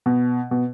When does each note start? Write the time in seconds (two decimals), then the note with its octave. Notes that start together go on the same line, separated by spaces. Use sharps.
0.06 B2
0.51 B2